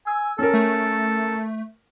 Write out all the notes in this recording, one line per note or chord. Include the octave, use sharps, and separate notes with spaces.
G#5 E6
C#4 A4 A#4
A3